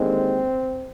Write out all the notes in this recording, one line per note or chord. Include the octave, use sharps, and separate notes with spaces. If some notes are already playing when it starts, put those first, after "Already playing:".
Already playing: D#2 D3 G#3 C4